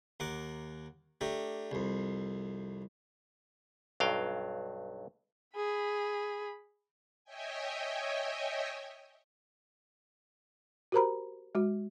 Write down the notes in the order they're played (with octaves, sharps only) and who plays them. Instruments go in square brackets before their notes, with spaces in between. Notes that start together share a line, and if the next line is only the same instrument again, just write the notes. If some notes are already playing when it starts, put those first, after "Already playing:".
[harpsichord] D#2 A#4 F#5 D6
A3 D4 G4 A#4
C2 F2
[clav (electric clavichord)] B1 G2 F#3 F5 G5
[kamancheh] G#4 B5
[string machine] C#5 D#5 E5 G5 G#5
[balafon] F#4 G4 A#4 C5 A#5 B5
G#3 F#4